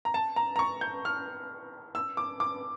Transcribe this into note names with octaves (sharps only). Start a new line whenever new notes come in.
A#5
A5
A#5
A#5
C#6
G6
F6
E6
D6
D6